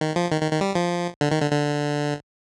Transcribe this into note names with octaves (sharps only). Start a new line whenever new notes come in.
D#3
F3
D#3
D#3
D#3
G3
F3
D3
D#3
D3
D3